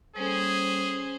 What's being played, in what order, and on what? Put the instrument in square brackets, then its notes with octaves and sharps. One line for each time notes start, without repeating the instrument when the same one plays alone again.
[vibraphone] G3 A#3 A4 [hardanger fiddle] C#4 C5 [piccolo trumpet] G#4